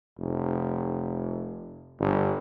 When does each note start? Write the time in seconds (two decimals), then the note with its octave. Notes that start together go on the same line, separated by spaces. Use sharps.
0.18 F1
1.99 G1